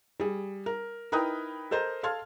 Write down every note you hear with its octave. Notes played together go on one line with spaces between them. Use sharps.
G3 G#4
A#4
D#4 E4 A#4 B4 G5 D#6
A4 A#4 C5 D#5 A#5
A4 F5 A5 C6 F6 G#6